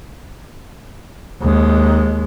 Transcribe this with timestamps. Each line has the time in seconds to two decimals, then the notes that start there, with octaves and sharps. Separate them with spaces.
1.42 D#2 G#3